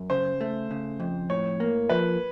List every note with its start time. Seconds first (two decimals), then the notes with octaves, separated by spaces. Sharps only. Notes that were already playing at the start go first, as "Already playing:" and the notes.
Already playing: F#2
0.10 C#3 C5
0.41 A3
0.71 C#3
1.00 F2
1.30 A2 C#5
1.60 A#3
1.89 F3 B4